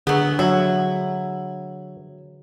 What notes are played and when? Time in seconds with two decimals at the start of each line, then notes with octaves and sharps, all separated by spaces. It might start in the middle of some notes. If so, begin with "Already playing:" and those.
0.07 D3 F#3 B3 G#4
0.39 F#3 E4